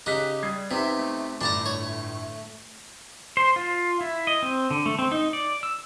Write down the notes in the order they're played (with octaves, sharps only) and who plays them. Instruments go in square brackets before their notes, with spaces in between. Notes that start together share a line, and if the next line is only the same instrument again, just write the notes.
[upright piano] C#3 F#6 B6 [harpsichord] D#4 [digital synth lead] G4
[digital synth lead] G3 [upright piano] D#6 G#6 C7
[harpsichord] C3 [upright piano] B3 D#4 [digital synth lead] E5
[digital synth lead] A3
[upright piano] G1 A2 [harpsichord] D4 A5 A#5
[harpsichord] C#5
[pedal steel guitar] C5
F4
E4
D#5
C4
D3
A3
C4
D#4
D5
E6